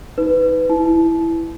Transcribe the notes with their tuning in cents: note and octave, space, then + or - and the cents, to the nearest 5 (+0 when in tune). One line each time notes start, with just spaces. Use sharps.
D#4 +30 B4 +20
E4 +0 A5 -30